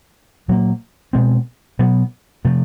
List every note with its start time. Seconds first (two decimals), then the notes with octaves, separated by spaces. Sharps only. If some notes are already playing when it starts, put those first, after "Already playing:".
0.48 A#2 F#3 A#3
1.13 B2 G#3 C4
1.79 B2 F#3 B3
2.45 C3 F3 A3